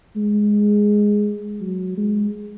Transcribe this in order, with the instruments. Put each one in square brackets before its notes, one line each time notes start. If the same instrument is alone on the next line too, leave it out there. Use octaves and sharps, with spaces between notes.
[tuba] G#3
F#3
G#3